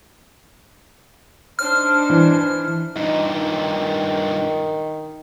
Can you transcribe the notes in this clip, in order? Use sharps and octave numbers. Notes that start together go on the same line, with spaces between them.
D4 D#4 C5 F6
E3
G2 A#2 D#4
D#3